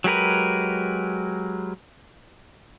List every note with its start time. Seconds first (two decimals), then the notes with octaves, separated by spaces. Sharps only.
0.04 F#3 G#3 G4 A#4 B4